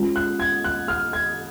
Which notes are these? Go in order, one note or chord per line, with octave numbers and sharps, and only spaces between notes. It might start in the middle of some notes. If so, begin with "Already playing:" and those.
Already playing: G#3 C#4 F4
F#6
G#6
F#6
F6
G#6